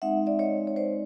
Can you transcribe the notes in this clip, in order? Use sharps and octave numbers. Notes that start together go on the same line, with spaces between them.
G#3 C4 D#4 E5 F#5
D5 E5
C#5 D#5
C#5
C5 D5